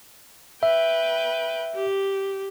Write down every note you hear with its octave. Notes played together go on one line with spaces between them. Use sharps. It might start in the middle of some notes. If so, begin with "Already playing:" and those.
B4 E5 G5
G4